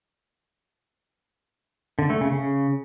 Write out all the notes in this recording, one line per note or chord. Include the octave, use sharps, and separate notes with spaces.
D3
A3
C#3
C#3